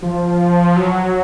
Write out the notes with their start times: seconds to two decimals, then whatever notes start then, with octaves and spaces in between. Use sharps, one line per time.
0.02 F3
0.76 F#3